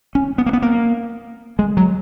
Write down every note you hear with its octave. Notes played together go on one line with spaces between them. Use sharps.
C#4
B3
A#3
B3
A#3
G#3
F#3